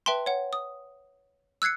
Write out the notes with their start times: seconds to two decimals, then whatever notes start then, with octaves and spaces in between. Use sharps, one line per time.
0.06 B4 E5 G5 A5 C6
0.26 C#5 F#5
0.53 D#6
1.62 E6 F#6 G#6 C7 C#7